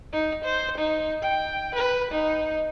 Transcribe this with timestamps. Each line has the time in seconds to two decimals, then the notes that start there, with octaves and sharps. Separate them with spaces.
0.13 D#4
0.44 C5
0.78 D#4
1.22 G5
1.75 B4
2.11 D#4